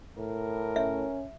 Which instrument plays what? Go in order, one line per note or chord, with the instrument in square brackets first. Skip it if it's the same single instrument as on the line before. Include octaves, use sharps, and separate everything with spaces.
[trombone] A2 [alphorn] A#4
[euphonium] C#4 [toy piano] E5